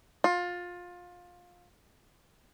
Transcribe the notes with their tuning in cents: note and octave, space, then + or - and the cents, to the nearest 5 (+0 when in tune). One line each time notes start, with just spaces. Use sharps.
F4 +20